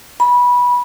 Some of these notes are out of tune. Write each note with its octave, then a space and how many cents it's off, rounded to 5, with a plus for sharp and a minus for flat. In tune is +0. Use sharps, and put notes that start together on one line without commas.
B5 -15